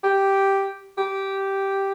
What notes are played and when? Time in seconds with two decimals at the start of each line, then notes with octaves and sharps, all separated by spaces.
0.04 G4
0.98 G4